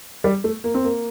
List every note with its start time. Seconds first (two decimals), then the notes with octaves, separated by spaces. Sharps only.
0.24 G3
0.44 A3
0.64 A#3
0.74 C4
0.84 A#3